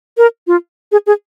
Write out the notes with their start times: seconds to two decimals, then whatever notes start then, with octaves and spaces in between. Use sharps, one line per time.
0.18 A#4
0.47 F4
0.92 G#4
1.07 G#4